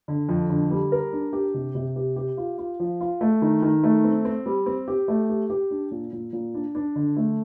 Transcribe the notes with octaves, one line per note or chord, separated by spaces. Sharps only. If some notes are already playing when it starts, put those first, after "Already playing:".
D3
F2
D3
G3
A#4
D4
G4
C3
C3
G4
G4
F4
F4
F3
F4
A3
D#3
D#3
A3
C4
C4
G3
C4
G4
A3
G4
G4
D4
A#2
A#2
A#2
D4
D4
D3
A3